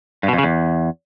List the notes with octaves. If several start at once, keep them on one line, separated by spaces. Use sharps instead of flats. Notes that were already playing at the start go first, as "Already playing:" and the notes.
G2
B2
F2
C#3
E2